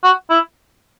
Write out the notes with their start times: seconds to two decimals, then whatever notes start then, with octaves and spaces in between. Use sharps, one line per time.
0.03 F#4
0.30 E4